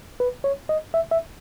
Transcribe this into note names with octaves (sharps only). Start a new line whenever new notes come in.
B4
C#5
D#5
E5
E5